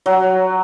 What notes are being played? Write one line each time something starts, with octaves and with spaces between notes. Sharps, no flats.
F#3